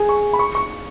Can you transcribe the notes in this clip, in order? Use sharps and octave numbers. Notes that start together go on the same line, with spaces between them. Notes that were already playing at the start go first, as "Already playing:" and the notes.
Already playing: G#4
C#6
B5
C#6
C#6